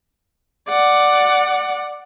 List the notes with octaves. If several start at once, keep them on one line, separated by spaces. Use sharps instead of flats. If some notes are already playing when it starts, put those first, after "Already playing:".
D5 F#5